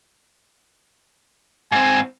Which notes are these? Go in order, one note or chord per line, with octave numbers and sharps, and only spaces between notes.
G#2 C4 G#5